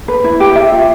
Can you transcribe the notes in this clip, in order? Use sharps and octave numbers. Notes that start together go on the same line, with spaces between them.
B4
E4
G4
E5
F4